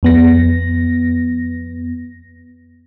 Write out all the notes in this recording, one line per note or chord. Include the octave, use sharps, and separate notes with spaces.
F2 B3 A#6